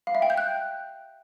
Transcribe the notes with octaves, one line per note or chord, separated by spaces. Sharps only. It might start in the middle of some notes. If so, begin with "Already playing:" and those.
F5
E5
G5
G6
F#6